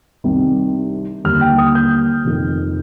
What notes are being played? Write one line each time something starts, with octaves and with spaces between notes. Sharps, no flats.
C2 C3 D#3 G3
D#2 D3 G3 F6
G5
D#6
G6
F1 F2 D#3